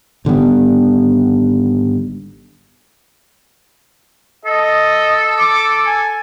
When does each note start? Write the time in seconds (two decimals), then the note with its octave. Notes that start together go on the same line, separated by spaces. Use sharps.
0.25 G#1 D3 G3 B3
4.45 A4 D#5
5.39 D6
5.87 G#5